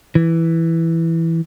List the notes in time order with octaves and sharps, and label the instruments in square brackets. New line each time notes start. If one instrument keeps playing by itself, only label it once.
[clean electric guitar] E3